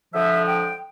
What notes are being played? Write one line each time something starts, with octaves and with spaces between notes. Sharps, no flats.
F2 D3 F3 G#3 E5
G5